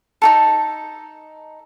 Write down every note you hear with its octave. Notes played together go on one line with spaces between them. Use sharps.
D#4 F4 A4